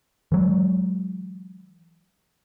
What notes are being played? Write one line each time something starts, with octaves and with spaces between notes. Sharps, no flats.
E3 F#3 G#3